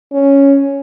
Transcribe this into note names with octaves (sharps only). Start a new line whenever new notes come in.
C#4